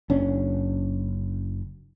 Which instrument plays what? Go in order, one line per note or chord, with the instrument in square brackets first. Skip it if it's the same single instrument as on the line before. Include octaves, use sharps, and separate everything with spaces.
[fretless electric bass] F#1 C#4 D4